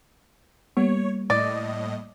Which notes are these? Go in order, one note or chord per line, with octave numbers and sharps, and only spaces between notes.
G3 A#3 B3 C#5
A2 D5 D#5